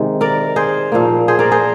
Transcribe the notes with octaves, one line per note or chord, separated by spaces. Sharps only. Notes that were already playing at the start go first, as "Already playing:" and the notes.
Already playing: C3 D#3 G#3
A#4 D5
G#4 C5
A#2 F3 A#3
G#4 C5
A#4 D5
G#4 C5